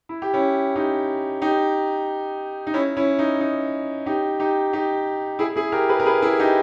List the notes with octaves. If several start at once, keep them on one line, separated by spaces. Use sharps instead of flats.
E4
G4
C#4 E4
D#4 G4
D#4 G4
D#4
C#4 E4
C#4 E4
D#4
D#4
D#4 G4
D#4 G4
D#4 G4
E4 G#4
E4 G#4
G4 A#4
G#4 B4
A#4
G#4 B4
E4 G#4
D#4 G4